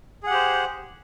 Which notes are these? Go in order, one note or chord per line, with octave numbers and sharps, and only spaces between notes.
G4 G#4 C5 F#5